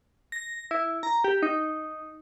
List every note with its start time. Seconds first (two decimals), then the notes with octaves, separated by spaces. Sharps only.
0.32 A#6
0.71 E4
1.03 A#5
1.24 G4
1.43 D#4